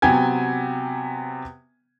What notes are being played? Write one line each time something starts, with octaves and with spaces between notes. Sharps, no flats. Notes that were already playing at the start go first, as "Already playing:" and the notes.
C3 F#3 B3 G5 G#5 G#6